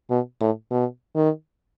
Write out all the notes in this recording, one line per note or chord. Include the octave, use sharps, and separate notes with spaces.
B2
A2
B2
D#3